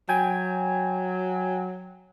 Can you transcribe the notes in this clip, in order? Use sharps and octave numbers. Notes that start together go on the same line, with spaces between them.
F#3 G5 G#5 G#6